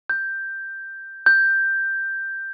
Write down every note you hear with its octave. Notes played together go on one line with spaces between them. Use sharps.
G6
G6